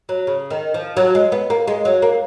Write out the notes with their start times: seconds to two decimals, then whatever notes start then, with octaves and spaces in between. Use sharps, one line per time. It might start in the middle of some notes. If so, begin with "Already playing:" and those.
0.09 F#3
0.27 C#3
0.50 D#3
0.74 F3
0.97 F#3
1.15 G#3
1.32 B3
1.50 A#3
1.68 G#3
1.85 F#3
2.02 A#3